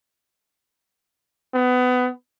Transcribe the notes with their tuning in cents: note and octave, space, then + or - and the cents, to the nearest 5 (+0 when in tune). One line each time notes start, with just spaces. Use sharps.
B3 +25